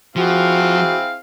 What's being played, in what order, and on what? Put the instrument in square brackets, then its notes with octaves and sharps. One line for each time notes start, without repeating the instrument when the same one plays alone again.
[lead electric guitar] F3 [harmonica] C4 E4 G#4 [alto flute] F#4 [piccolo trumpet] F5